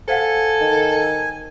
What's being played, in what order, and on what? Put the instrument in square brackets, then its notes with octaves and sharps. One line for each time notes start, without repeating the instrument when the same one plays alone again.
[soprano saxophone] A4 [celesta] C5 F5 F#5 [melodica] G#5
[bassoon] D#3